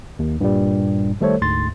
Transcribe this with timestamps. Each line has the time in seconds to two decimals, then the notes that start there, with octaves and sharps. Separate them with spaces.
0.19 D#2
0.41 G2 A#2 G3
1.21 D#3 G3 A3 A4 C5 C#5
1.41 D2 G#2 C6 A6